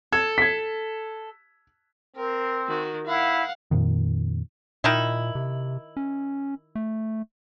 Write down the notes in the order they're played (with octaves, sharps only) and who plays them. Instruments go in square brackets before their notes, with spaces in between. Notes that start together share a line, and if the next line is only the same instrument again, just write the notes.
[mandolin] A4 [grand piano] G#6
[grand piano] G#6 B6
[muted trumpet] C4 [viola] A#4
[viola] D#3 F#4
[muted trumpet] E4 [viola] F5 F#5
[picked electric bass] F2 A#2 D#3
[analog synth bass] A#2 [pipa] D#3 D#4 E4
[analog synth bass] C3
C#4
A3